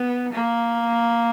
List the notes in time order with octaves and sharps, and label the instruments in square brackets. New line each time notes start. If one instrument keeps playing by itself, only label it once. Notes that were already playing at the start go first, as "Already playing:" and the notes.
Already playing: [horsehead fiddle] B3
A#3